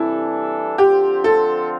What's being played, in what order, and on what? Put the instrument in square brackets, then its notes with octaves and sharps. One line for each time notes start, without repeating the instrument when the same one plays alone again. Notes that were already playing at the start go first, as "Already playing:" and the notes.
Already playing: [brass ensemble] C3 E3 G3 D4 A4 [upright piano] E4
[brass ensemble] D3 F3 C4 F4 [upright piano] G4
[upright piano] A4